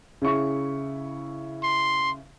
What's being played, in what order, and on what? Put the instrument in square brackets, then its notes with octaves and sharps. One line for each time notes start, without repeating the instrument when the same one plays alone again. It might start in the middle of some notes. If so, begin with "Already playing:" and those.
[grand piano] C#3 E4 C#6
[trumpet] C6